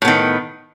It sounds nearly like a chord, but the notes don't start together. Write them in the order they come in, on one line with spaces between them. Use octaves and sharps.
A2 B3 D#3